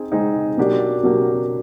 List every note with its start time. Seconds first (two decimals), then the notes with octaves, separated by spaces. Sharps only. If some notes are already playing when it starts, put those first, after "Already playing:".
Already playing: C4 D#4 G#4
0.12 G#3 C4 D#4 G#4
0.57 B2 F#3 A#3 D4 G4
1.03 B2 F#3 A#3 D4 G4